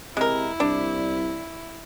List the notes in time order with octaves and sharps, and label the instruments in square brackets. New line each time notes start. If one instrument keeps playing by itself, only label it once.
[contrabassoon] C3 [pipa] G#3 A#4 [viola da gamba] E4
[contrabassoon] C2 [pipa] D4